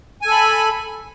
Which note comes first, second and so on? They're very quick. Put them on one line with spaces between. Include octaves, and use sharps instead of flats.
G#5 A4 B5